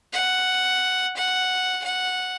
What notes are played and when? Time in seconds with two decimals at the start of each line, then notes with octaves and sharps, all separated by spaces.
0.13 F#5
1.17 F#5
1.84 F#5